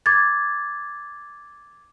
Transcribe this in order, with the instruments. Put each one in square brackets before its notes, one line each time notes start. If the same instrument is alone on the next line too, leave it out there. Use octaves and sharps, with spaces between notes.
[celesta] D6 G#6 A6